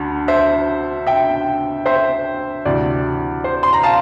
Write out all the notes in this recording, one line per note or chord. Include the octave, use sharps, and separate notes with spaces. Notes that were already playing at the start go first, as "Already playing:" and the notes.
Already playing: D2 D3
C5 E5
E5 G5
C5 E5
D2 C3 E3 D5
C5
C6
A#5
F5 A5